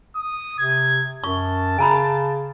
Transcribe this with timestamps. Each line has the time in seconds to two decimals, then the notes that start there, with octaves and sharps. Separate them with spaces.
0.16 D#6
0.59 C3 G#6
1.24 F#2 A5 C#6
1.78 C#3 G#5 A#5 B5